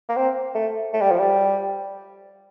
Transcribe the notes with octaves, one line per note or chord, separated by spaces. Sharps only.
A#3
C4
A3
A3
G3
F3
G3